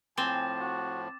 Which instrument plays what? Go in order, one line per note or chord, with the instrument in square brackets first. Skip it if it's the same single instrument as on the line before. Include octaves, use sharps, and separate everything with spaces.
[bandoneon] A2 F3 [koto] C4 [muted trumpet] G#5 [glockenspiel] D6 A6 E7
[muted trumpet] F#4